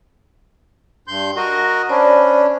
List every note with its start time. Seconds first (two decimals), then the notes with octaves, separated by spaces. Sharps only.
1.08 G2 C6 G6
1.36 F#4 A#4 D#5
1.89 C#4 D4 C5 D5 B5